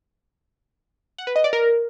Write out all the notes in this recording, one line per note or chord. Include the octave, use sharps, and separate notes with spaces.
F#5
B4
D#5
D5
A#4